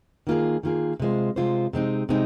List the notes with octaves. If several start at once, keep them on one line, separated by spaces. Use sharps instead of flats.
D#3 A#3 F4 G#4
D#3 A#3 F4 G#4
C3 G#3 F4 C5
C3 G#3 F4 C5
C3 G#3 C4 D#4
C3 G#3 C4 D#4